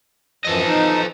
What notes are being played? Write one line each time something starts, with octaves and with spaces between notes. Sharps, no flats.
F#2 E3 F3 A4 D#5
D#4